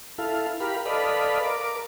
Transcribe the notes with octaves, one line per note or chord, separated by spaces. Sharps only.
E4 A4 F5
G4 A#4 F5 B5
A4 B4 D5 D#5 F5 B5
A#4 D6